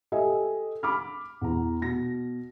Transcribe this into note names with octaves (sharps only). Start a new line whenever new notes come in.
G4 A4 D#5 E5 G#5
B5 D6 F6
E2 A#5
B2 A#6